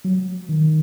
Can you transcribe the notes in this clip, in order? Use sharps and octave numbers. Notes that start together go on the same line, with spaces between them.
F#3
D#3